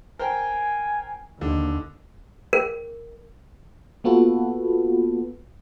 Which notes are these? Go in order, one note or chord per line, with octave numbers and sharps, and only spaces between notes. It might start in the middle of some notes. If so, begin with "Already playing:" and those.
A#4 C5 G5 G#5
D#2 D3
A#4
A#3 B3 F4 F#4 A4 B4